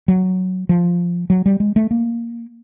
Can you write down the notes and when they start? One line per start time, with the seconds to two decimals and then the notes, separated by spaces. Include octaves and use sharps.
0.08 F#3
0.69 F3
1.30 F#3
1.46 G3
1.60 G#3
1.76 A3
1.91 A#3